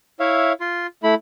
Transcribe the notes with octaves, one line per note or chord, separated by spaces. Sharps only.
E4 C#5 E5 F5
F4 C6
A3 E4 B5